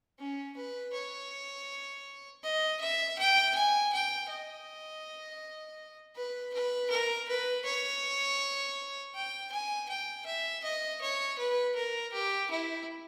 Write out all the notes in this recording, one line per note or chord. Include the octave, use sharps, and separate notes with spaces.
C#4
B4
C#5
D#5
E5
G5
G#5
G5
D#5
B4
B4
A#4
B4
C#5
G5
G#5
G5
E5
D#5
C#5
B4
A#4
G4
E4